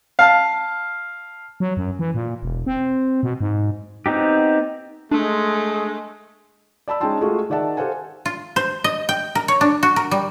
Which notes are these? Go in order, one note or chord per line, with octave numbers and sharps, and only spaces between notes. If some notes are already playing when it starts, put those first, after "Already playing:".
F5 A5
F#3
F#2
E3
A#2
E1
C4
B2
G#2
B3 C4 D#4 G4
G#3 A3 D4
D5 A5 B5 E6
G#3 C#4 D#4 G5 A5 C6
G#3 A3 F4 F#4 G#4 A4
D#3 G#4 D5 E5 F#5 A5
G4 A4 C5 F5 F#5 G#5
F4
C5
D#5
G5
A#4
C#5
D4
F#4
A#4
G3